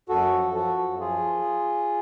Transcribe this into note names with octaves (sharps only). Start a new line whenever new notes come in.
F#2 F#4 A4
F3
F3 F#4 A4
F#2
F3 F4 G#4